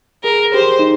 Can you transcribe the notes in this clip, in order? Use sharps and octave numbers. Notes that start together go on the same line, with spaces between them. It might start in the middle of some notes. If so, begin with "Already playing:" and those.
G#4 A#4
G4 C5
D#4